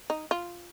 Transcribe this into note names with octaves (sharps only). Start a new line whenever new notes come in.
D#4
F4